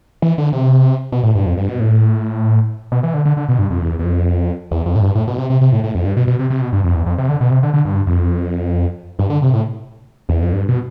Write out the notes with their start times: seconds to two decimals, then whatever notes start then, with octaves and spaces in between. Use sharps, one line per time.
0.22 E3
0.38 D3
0.53 C3
1.12 B2
1.23 A2
1.35 G2
1.46 F2
1.58 G2
1.69 B2
1.80 A2
2.92 B2
3.03 E3
3.14 D3
3.25 D3
3.37 D3
3.48 B2
3.59 G2
3.71 F2
3.81 E2
3.99 E2
4.04 F2
4.71 E2
4.86 F2
4.96 A2
5.01 G2
5.15 A2
5.28 B2
5.38 C3
5.50 C3
5.61 C3
5.72 A2
5.84 A2
5.95 F2
6.05 G2
6.17 B2
6.27 B2
6.39 C3
6.50 C3
6.61 B2
6.73 G2
6.84 F2
6.95 E2
7.06 F2
7.18 C3
7.29 D3
7.41 B2
7.51 C3
7.63 D3
7.74 D3
7.85 G2
8.07 F2
9.19 G2
9.30 D3
9.42 C3
9.53 A2
10.29 E2
10.42 F2
10.53 G2
10.69 B2